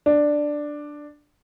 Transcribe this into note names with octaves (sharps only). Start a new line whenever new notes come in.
D4